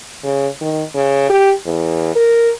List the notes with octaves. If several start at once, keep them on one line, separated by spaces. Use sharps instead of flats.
C#3
D#3
C#3
G4
E2
A#4